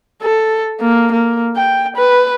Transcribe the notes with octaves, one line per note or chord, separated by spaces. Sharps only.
A4
A#3
A#3
G5
B4